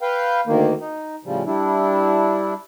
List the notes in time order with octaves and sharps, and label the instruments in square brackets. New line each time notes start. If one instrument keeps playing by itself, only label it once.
[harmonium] B4 F5 G5
D2 D#3 A#3
D#4
A2 C#3 F3 G3
G3 D4 E4